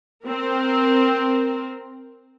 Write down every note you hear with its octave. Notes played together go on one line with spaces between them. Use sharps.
C4 A#4